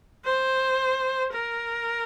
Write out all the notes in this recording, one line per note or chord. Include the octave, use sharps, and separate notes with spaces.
C5
A#4